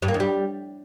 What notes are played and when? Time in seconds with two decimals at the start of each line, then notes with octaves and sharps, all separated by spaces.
0.02 G2
0.08 A#3
0.14 E2
0.20 G3